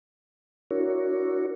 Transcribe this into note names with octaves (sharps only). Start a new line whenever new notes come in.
D4 E4 F#4 A#4 C#5